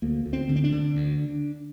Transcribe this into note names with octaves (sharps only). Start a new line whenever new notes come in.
D2 A#3
D2
C4
D3
C4
D4
D3
D2